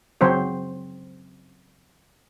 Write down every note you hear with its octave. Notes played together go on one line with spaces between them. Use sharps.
C#3 F#3 C4 C5 C#5